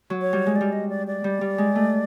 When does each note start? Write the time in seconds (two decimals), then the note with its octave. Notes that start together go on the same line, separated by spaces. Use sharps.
0.10 F#3
0.21 C#5
0.33 G3
0.46 G#3
0.56 D5
0.61 G3
0.72 D#5
0.89 D5
1.07 D5
1.24 G3
1.41 G3
1.58 G#3
1.75 A3